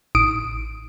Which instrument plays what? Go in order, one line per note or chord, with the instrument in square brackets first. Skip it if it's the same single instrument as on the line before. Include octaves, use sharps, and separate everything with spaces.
[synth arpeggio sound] A1 D#6 D7